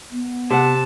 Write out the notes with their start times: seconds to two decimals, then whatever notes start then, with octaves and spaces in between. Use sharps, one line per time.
0.12 B3
0.50 C3 F#5 A5